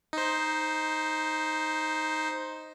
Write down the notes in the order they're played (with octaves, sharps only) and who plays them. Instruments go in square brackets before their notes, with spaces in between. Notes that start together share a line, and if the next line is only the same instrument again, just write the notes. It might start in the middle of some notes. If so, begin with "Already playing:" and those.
[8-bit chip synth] D#4 C5